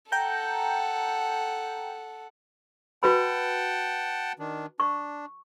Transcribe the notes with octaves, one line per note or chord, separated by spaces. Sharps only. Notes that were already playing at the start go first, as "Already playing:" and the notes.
A4 F#5 G5 A#5 G6
F#4 B4 F#5 G5 A5 B5
D#3 D4
D4 C#6